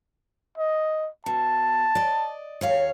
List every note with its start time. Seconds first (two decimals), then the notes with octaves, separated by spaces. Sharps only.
0.58 D#5
1.26 B2 A5
1.95 D5 D#5
2.61 D#2 C#5 F5